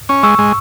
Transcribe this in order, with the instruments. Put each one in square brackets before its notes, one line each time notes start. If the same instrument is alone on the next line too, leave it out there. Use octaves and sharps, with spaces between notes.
[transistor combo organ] C#4
[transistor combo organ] G#3 [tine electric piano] C#6 E6
[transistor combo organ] G#3